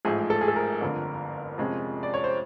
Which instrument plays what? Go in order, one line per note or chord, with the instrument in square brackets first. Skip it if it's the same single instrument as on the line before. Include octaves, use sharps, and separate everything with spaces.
[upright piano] A1 G#2 F3 A3 G#4
A4
G#4
A4
A#4
G1 F2 D3
F2 C3 F3 G#3 C#4
D5
C#5
C5